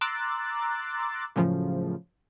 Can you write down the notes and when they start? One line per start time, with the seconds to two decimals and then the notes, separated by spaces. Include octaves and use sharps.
0.01 A#5 C6 D6 E6 F#6 A6
1.36 F#2 A2 C#3 F3